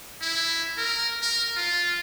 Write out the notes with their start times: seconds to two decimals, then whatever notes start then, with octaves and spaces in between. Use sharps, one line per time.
0.21 E4
0.78 A#4
1.22 A#4
1.57 F4